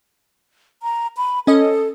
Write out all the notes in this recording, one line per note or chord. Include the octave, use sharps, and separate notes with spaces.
A#5
B5
C#4 A4 D#5